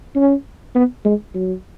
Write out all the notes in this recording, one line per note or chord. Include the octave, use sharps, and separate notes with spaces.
C#4
B3
G#3
F#3